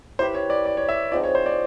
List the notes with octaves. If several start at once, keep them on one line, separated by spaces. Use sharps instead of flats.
E4 G4 B4 C5
C#5
D5
D5
C#5
E5
F3 G#3 C4 D#4 D5
C#5
C5
D5